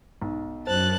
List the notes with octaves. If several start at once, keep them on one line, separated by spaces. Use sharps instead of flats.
B1
F#2 C5 A5 F#6